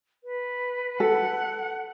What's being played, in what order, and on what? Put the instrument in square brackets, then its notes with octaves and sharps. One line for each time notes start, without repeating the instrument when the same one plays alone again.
[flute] B4
[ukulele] A4 [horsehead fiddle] F#5